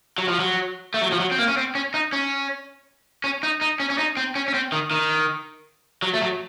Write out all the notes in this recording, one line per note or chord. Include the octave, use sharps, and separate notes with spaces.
F#3
F3
F#3
A3
F#3
F3
F#3
C4
A#3
C#4
C4
C#4
D#4
C#4
C#4
D#4
D#4
C#4
C#4
D#4
C4
C#4
C#4
C4
D#3
D#3
F#3
A3
F#3